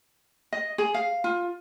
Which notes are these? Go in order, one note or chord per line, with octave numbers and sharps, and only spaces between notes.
D#5
G#4
F5
F4